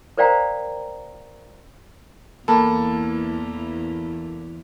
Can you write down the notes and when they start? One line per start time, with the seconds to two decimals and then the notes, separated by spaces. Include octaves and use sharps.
0.17 A#4 C5 D5 F5 G5 A#5
2.48 E2 E3 A#3 A4 A5 B5